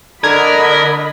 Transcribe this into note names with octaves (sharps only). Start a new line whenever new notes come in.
D3 A#4 D#5 B5 G#6